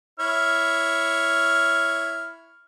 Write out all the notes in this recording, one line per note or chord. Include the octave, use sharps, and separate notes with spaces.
E4 C#5 F6